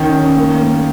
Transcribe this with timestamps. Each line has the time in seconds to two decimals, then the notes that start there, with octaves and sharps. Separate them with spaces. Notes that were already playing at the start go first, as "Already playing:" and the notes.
Already playing: D#3 C#4
0.12 C#4
0.37 A#3
0.60 A#3